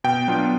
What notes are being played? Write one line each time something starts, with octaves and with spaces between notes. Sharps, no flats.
B2 G5
F#3 B3 D4 F4